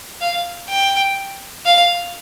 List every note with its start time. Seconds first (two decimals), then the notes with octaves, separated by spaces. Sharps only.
0.21 F5
0.70 G5
1.66 F5